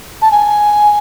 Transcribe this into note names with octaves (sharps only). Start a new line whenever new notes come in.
A5
G#5